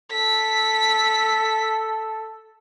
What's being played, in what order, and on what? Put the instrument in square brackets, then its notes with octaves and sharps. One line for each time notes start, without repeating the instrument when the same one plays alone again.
[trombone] A4 [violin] B6